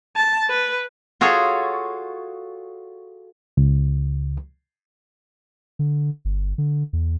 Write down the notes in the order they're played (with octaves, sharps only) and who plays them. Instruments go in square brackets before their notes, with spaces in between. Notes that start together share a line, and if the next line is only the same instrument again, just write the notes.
[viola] A5
B4
[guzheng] F4 F#4 G#4 A4 C#5
[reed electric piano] C#2
[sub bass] D3
G1
D3
E2